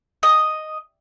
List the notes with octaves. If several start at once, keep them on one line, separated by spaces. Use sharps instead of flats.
D#5